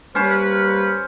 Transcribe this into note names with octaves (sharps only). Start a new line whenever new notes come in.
G3 A#3 C#4 B4 C5